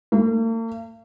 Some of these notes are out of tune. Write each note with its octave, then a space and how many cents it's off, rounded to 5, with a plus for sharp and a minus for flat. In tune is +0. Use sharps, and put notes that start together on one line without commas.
A#3 -45